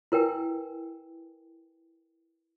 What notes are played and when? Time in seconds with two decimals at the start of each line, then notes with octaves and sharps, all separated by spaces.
0.12 E4 A#4 B4 G5 G#5